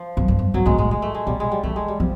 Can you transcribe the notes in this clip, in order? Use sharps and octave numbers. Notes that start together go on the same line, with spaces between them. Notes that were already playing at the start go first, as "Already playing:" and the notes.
Already playing: F3
F#2
G2
F#2
G2 F#3
G#2 G#3
A2 G#3
G#3
A3
G#3
A#2 G3
G#3
G3
E3 A3
G#3
G3
F3